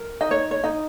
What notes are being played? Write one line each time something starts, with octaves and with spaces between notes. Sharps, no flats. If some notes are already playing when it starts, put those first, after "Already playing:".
Already playing: A#4
D#4 D#5
C#5
C#5
D#4 D#5